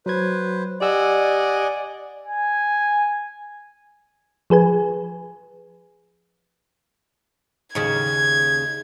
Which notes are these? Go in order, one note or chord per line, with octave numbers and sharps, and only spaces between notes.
F#3 B4 C5 G#6
G4 D5 D#5 F#5 G#5 E6
G#5
F3 G#4 B4 G#5
D#2 C#3 G#6